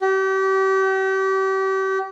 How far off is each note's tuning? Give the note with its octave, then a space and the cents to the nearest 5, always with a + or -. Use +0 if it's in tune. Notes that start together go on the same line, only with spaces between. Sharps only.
G4 -35